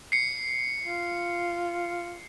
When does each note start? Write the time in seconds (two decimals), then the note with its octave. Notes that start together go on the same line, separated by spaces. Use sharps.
0.12 C7 C#7
0.83 F4